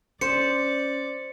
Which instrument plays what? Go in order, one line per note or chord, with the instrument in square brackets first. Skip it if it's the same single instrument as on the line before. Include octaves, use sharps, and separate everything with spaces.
[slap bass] C#4 [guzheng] C5 [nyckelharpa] D5 [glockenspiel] C#7